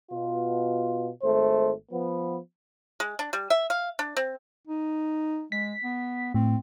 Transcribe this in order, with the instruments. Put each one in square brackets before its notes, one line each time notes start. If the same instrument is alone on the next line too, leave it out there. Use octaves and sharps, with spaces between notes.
[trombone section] B2 F4
G#1 A3 C5
F3 B3
[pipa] G#3
D4
G3
E5
F5
D4
C4
[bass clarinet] D#4
[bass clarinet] G#3 [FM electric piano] B6
[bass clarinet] B3
[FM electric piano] A2 [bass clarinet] C4